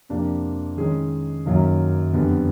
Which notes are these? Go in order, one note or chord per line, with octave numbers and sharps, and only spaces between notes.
F2 C3 F3 A#3 D4
D#3 G#3 C#4 E4 G#4
F#2 D#3 F#3 A#3 C#4
F2 D3 G3 B3